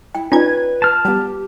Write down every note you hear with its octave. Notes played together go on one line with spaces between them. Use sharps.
E4 G5
C#4 D#4 F4 B4 D5 G#6
A5 F6
G3 B3 G4